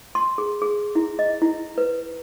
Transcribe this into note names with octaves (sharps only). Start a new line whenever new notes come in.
C6
G#4
G#4
E4
D#5
E4
B4